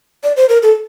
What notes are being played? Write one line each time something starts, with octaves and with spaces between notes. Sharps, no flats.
D5
C5
A#4
A4